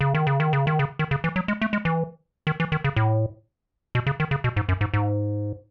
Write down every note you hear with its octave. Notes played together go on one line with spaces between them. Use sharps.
C#3
D#3
C#3
D#3
C#3
D#3
C#3
D#3
C#3
E3
F#3
G#3
A3
G#3
E3
D#3
E3
D#3
C#3
A2
B2
C#3
D#3
C#3
B2
G#2
F#2
G#2
G#2